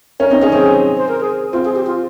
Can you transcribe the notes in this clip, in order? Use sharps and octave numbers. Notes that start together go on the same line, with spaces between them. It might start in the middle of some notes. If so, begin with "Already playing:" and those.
C#4 A#4
C4 D#4
C#4 G#4
C4 G#4
C5
A#4
G#4
C4 F4
G#4
G4
F4